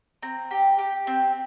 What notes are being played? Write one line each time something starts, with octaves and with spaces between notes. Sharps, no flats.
C4 A#5
G4
G4
C4